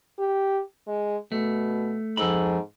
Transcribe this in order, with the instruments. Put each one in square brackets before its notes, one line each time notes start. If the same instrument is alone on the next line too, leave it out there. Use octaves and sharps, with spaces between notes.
[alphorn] G4
G#3
[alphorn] B2 [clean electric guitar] A3
[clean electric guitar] F2 A4 B5 [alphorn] G#2